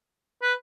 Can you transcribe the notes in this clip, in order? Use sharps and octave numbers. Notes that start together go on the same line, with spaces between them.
B4